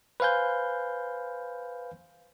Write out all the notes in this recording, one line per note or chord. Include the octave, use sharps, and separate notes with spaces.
B4 C5 F5 G#5 G6